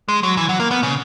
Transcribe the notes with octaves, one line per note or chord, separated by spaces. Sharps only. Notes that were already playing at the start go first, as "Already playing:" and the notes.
G#3
F#3
E3
F#3
A#3
B3
C#3